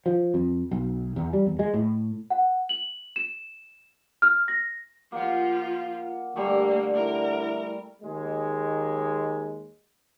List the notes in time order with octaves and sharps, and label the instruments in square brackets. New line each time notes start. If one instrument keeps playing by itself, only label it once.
[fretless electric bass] F3
F2
B1
E2
G3
E2
G#3
A2
[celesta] F#5
F#7
E7
F6
A#6
[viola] F3 F4 [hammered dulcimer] A#3 F#5
[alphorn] D3 [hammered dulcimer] G3 A3 [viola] A#3
[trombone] E4 [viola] A#4
[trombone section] D#2 G#3